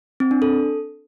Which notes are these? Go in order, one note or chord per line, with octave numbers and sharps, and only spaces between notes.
C4
D4
A4